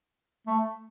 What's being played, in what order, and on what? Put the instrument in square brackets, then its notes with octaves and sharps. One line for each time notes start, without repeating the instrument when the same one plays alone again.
[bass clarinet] A3